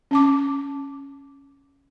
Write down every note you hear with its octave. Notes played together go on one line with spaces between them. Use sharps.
C#4 A5 D6